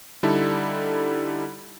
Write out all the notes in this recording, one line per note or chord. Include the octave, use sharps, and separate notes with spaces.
D3 G3 D#4 E4 A4